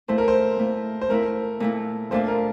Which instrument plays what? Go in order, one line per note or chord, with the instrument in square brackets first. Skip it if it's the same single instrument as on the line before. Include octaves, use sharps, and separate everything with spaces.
[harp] A#2 A3 E4 [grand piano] C5
[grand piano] A#4
C5
[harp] A#2 A3 E4
[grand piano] C5
[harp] A#2 A3 E4 [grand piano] A#4
[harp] A#2 A3 E4
[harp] A#2 A3 D4 F4 [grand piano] C5
[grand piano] A#4